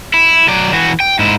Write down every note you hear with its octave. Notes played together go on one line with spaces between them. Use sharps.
E4
F#3 D5
E3 F#4
G5
G#2 E4